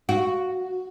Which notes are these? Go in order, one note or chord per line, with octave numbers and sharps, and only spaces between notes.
F#4